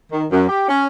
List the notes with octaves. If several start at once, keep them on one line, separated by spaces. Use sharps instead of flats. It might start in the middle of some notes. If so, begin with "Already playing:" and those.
D#3
F#2
G4
C#4